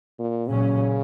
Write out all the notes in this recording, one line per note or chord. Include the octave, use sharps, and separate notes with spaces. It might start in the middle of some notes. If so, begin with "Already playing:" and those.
A#2
A#2 C#3 F#3 C#4